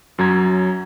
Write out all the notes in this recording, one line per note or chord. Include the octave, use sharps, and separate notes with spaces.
F#2 F#3 A#5 G#6